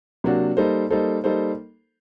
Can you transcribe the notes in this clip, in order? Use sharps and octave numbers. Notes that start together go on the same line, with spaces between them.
C3 F#3 A#3 D4 F#4
G3 A#3 D#4 A4 C5
G3 A#3 D#4 A4 C5
G3 A#3 D#4 A4 C5